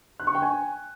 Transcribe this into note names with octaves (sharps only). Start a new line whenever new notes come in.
F#6
C#6
G5
G#5